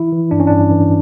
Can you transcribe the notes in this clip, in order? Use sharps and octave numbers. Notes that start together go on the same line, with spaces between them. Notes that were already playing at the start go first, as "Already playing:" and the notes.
Already playing: E3 E4
E3
G2 D4
C#4
G2 D4
E3